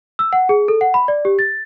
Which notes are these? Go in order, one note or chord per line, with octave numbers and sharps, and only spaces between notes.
E6
F#5
G#4
A4
F#5
B5
D5
G4
A6